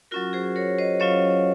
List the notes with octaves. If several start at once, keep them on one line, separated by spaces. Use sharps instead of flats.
F#3 C#4 F4 F#4 A#4
G#4 C5
A#4 C#5
C5 D#5
F#3 C#4 F4 C#5 F5